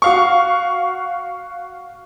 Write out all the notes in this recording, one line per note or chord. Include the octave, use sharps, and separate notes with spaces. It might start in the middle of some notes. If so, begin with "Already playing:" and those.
F#4 F5 C#6